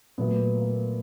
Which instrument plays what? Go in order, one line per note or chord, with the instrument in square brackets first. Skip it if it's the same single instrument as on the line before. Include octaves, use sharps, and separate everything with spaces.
[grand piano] A#2 F#3 A3 B3
A#3